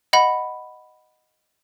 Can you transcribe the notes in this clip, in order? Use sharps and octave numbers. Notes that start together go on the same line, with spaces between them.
D#5 F#5 B5